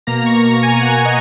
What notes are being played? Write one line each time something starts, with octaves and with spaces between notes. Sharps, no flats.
B2 A#3 A#5
C#6
A#5
G#5
F#5
D#5